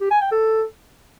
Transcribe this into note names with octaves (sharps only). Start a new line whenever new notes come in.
G4
G#5
G5
A4